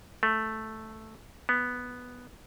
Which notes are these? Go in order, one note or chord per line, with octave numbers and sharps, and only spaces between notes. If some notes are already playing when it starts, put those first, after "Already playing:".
A3
B3